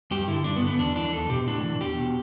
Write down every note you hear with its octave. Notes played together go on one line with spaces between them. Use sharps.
G2 G4
D3 E4
G2 D4
B3
D3
B3
E2 D4
E3 D4
E2 A4
B2 G4
A2 D4
E3
E2 G4
B2